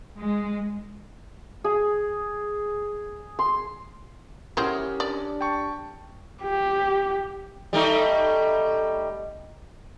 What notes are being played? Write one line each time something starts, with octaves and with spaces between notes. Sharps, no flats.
G#3
G#4
C6
F#3 C4 C#4 E4 G4 G#4 A#4
D4 D5
G5 A5 C#6
G4
G3 A3 D#4